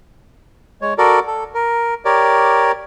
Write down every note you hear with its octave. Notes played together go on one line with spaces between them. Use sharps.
G#3 C#5
F#4 A4 A#4 D5
A4
A#4
G4 A#4 C#5 D5